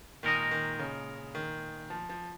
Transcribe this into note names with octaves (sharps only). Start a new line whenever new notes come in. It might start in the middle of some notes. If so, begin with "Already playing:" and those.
A#2 D#3 G#3 D#4 A#4 D#5
D#3
C#3
D#3
F3
F3